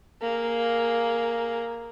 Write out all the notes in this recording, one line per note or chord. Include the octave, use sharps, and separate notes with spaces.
A#3 G#4